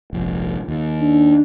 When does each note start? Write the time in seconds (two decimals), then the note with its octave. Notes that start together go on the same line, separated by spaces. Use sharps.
0.13 F1 A#1
0.68 D#2
1.01 D4